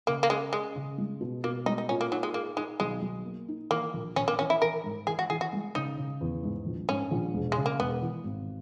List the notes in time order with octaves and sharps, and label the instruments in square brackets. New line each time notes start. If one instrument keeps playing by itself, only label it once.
[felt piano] C#3 [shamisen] A#3
[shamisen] A#3
[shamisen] G#3 [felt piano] C#4
[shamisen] G#3 [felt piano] C#4
[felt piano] C#3
G#3
B2
[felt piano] B2 [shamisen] A#3
[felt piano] G#3 [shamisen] D#4
[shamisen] D#4
[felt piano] A#2 [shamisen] C#4
[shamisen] A#3
[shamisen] F#3 [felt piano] D#4
[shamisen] G#3
[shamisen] A#3 [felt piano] G#4
[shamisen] G#3 [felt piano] D#4
[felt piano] B1 [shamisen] G#3
[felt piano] B1
A#3
D#4
[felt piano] E3 [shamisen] A#3
[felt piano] A#1
[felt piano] A#1 [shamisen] C#4
[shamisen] A#3
[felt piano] E3 [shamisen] C#4
[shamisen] E4
[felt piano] E3 [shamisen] A#4
[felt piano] G#2
[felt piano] E3 [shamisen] G#4
[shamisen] F#4
[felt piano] E3 [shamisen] G#4
[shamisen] F#4
[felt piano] G#3
[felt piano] C#3 [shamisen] D#4
[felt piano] C#3
E2
G#2
A#1
[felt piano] G#2 [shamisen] C#4
[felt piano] A#1
E1
[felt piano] C#3 [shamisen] G#3
[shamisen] A#3
[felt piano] E1 [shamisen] B3
[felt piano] E3
G#1